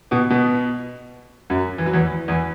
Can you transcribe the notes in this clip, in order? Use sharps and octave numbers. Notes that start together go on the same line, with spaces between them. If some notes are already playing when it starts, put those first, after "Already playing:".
B2 B3
B2 B3
F#2 F#3
E3
F#3
E2 E3
E2 E3